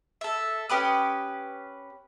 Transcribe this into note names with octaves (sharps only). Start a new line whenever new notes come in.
A4 E5
C#4 G4 B4 D#6